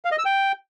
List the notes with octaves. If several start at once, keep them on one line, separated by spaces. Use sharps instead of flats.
F5
D#5
E6
G5